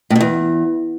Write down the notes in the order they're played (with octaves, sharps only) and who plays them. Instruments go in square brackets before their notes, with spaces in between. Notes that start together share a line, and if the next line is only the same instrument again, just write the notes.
[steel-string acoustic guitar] A2
B2
E2